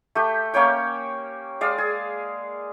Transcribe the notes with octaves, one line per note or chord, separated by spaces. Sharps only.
A3 G4 G5
A#3 C#4 C#5 G5
G#3 D5 F5
G#4